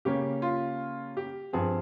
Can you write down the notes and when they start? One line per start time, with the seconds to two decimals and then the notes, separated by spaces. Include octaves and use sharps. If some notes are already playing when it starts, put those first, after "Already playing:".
0.05 C#3 G3 A#3 C#4 G4
0.42 F4
1.17 G4
1.53 G2 F3 C4 G#4